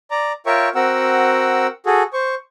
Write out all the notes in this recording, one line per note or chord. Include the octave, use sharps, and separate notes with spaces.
D5 A#5
F4 A#4 C#5 E5 G5 C#6
C4 F#4 A#4 F#5 E6
F#4 G#4 A4
C5 C#6